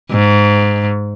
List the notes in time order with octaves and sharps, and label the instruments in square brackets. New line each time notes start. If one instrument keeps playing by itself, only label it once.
[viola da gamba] G#2